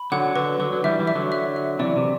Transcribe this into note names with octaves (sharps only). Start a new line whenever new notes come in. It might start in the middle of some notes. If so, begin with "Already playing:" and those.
Already playing: B5
D3 F#3 F#5
D3 F#3 B4
D3 F#3 B4
F#3
E3 G3 E5
E3 G3
E5
D3 F#3
E5
E5
C3 E3 D5
C3